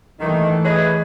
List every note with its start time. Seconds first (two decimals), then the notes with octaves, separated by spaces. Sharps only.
0.20 D#3 E3 A3
0.65 G#4 B4 C#5 D#5